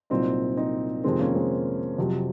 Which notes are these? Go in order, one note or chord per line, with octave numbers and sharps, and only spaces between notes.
C2 A#2 F#3 C4 D#4
C4 D#4
F2 C3 D#3 G#3 C4
A#3 C#4
G#3 C4
F2 C3 F#3